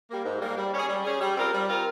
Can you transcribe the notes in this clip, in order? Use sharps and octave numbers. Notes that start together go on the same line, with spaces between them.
G3 A#3
G#2
G3 A#3
G3
C#4 G#4
G3
C#4 G#4
G3
C4 F4 A#4
G3
C4 F4 A#4